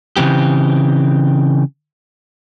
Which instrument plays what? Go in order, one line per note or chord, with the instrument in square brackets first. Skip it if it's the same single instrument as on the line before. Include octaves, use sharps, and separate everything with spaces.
[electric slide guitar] C#3 E3 C4 G4